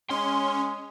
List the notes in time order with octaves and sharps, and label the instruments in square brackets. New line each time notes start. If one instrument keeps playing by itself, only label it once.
[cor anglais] G#3 [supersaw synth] C#4 [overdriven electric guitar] C6